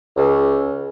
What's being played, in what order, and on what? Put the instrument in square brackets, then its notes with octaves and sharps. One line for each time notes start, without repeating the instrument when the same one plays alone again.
[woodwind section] C#2